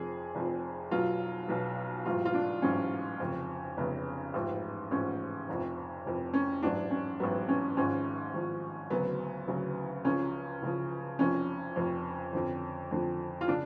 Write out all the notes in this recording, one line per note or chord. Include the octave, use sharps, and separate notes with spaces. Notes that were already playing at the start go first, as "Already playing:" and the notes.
Already playing: F1 F2 F3 G#4
F1 F2 F3
B1 B2 F#3 F4
B1 B2 F#3
A1 G#2 F#3 F4
F4
D4
A1 G#2 F#3 C#4
F1 F2 C#3
F1 F2 C#3 B3
A1 G#2 F3
A1 G#2 F3 C#4
F1 F2 F3
F1 F2 F3
C#4
A1 G#2 F#3 D4
C#4
A1 G#2 F#3 B3
C#4
G#1 G#2 F3 C#4
G#1 G#2 F3
D2 C#3 F#3 B3
D2 C#3 F#3
C#2 C#3 F3 C#4
C#2 C#3 F3
F1 F2 F3 C#4
F1 F2 F3
F2 D3 F3
F2 D3 F3
F4
C#3 F3 D4